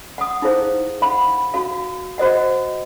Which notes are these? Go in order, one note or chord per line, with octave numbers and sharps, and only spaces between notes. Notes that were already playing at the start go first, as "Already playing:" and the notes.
F#5 D#6
D#4 E4 G#4 C5 F5
F5 F#5 B5
F#4 F5
F#4 C5 D#5 F#5